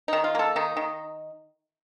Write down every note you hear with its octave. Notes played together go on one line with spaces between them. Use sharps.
D#3 D#4
F4
A#3 A4
D#3 D#4
D#3